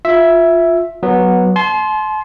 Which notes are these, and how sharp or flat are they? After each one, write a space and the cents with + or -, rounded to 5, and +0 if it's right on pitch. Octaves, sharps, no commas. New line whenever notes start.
F4 +10 E5 +0
F#3 +0 B3 -10
A5 -40 C6 +0